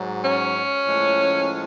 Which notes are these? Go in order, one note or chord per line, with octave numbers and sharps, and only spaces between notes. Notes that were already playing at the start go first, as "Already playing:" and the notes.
Already playing: G#2 F#3
C#4
A2 F3 G#3